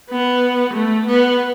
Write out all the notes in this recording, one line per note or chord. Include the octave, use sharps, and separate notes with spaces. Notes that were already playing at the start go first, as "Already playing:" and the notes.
B3
A3
B3